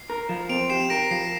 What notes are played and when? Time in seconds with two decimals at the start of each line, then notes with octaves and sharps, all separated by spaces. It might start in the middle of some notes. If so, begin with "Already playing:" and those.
Already playing: C7
0.10 A#4
0.29 F3
0.49 C4 D7 F7
0.70 G4 C7 E7
0.90 A#4 A#6 D7
1.11 F3 C7